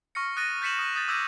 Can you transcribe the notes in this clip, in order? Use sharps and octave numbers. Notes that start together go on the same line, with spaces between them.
C#6 F6 A#6 C#7
D#6 F#6 A6 A#6 D#7
G6 A6 B6 C#7 E7 F#7
D#6
D#6 G6 A6
D6 E6 G6 G#6 A#6 D#7